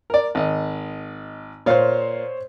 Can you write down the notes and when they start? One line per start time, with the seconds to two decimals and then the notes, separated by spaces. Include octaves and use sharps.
0.10 A#4 D5
0.35 G#1 D#5
1.66 A#2 C5 C#5 F5